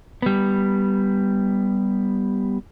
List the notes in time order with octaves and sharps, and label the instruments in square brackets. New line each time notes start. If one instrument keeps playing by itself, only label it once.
[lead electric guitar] G3 B3